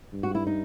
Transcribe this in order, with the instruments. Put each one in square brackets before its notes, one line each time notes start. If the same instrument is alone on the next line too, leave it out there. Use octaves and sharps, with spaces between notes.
[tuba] G2
[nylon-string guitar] F#4
E4
D#4